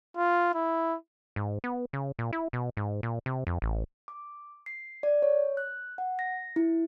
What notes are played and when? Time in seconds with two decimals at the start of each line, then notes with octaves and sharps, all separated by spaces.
0.17 F4
0.54 E4
1.36 G#2
1.64 B3
1.93 C#3
2.19 A#2
2.33 E4
2.53 B2
2.77 G#2
3.03 A#2
3.26 C3
3.47 F2
3.62 A1
4.08 D6
4.66 C7
5.03 D5
5.22 C#5
5.57 F#6
5.98 F#5
6.19 A#6
6.56 E4